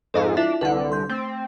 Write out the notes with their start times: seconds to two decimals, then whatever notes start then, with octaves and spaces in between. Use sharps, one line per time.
0.14 F2 G#2 A4 D#5 F5
0.37 D4 E4 F4 E5
0.61 C2 D3 B4 F#5
0.92 C6 G6
1.09 A3 C4